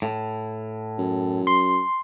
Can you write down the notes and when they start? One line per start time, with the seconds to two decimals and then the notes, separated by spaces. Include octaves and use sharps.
0.02 A2
0.98 F#2
1.47 C6